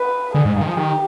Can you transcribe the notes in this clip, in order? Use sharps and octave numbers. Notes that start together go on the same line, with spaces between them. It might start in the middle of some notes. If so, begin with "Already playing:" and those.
Already playing: B4
D3 G#4
G#2
G2
D#3
F3
D#3 G4